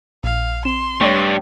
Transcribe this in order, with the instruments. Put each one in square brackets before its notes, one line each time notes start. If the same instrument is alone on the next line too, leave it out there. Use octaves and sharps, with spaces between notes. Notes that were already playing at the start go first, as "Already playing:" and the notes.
[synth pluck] A#1 [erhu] F5
[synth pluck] C4 [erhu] C6 [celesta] E7
[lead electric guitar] G2 G3 [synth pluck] A3 C#5 [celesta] D5 C#6